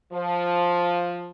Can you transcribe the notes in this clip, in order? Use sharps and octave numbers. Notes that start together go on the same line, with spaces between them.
F3